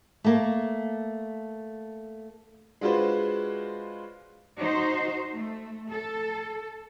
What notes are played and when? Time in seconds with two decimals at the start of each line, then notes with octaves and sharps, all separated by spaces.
0.24 A3 A#3
2.81 G#3 D4 F4 F#4 B4 C5
4.59 D#4 F#4 C5
5.34 A3
5.91 A4